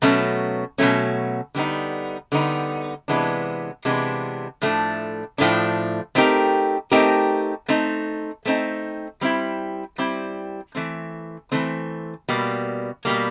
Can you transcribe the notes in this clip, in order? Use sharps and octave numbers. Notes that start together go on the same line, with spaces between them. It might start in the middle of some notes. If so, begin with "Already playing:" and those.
B2 F#3 A3 C#4
B2 F#3 A3 C#4
D3 G3 B3 D#4
D3 G3 B3 D#4
C3 E3 G#3 B3 D4
C3 E3 G#3 B3 D4
A2 F3 A3 D4
A2 F3 A3 D4
A3 C4 D#4 G4 A#4
A3 C4 D#4 G4 A#4
A3 C4 D#4
A3 C4 D#4
G3 C4 E4
G3 C4 E4
E3 A3 C4
E3 A3 C4
B2 G3 A#3
B2 G3 A#3